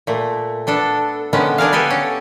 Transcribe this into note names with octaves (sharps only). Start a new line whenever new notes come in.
A#2 A3
B3 D4 A4
D3 D#3 G#3 B3 C#4
D4 G#4 A#4 F5
B3 G4 A4 G#5
C#4